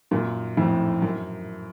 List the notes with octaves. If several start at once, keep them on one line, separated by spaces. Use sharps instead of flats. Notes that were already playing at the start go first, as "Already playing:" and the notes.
F#2 A#2
F2 A2
F#2